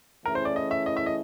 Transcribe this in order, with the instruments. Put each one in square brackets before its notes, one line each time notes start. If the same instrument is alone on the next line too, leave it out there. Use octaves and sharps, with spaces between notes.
[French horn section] E3 A3 C#4 E4 G#4 [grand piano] A#4
[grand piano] C5
D5
D#5
E5
D#5
E5
D#5